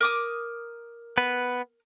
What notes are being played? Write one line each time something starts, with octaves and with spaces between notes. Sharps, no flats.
A#4 D6 D#6
B3 B4